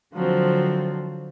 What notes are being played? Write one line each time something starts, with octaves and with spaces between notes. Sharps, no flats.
D3 F3 F#3 C4